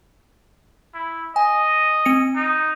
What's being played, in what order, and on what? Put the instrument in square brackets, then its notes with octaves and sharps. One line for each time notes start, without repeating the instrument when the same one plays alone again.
[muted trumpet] E4
[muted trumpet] D#5 [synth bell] G#5
[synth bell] C4 C#7
[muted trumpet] D#4